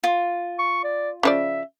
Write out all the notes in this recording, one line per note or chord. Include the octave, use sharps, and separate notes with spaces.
F4
C#6
D5
C#3 F3 D5 E5